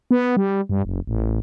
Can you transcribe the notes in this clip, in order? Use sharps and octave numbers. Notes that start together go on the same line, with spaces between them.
B3
G3
G2
F#1
A1